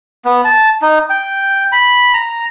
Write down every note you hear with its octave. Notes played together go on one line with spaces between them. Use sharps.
B3
A5
D#4
G5
B5
A#5